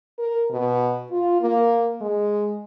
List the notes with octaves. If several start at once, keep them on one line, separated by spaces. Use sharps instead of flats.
A#4
B2
F4
A#3
G#3